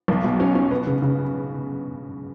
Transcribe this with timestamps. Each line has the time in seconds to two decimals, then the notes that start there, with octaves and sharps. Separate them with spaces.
0.08 B1
0.24 B2
0.40 C#4
0.55 C#4
0.71 B3
0.87 C#3
1.02 C#3